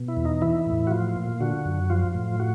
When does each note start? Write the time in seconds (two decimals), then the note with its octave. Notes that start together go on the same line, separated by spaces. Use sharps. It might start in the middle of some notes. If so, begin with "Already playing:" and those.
Already playing: B2
0.08 E4
0.17 E2
0.25 D#4
0.42 E3 E4
0.66 A2
0.87 F#4
0.91 F3 F4
1.16 A#2
1.40 D3 F#4
1.65 F#2
1.90 F3 F4
2.15 A2
2.40 F#4